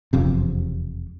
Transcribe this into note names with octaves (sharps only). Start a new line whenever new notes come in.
E1 F2 C3